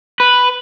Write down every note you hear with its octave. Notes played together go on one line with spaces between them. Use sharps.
B4